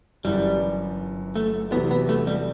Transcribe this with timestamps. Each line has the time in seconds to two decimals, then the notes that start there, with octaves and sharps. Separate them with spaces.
0.24 G1 F#2 E3 G3
1.36 A3
1.72 E2 C3 F#3 B3
1.91 B3
2.09 A3
2.27 G3